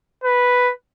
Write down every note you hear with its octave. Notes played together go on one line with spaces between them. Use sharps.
B4